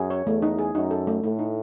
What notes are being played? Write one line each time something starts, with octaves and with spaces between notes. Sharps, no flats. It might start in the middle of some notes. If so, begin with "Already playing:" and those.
Already playing: F#2 G#4
C#5
E2 A3
D#4
G#4
F#2 D#4
A4
A3
A2 A3
D#4